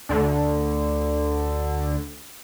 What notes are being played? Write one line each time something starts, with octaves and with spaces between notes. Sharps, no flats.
D2 D3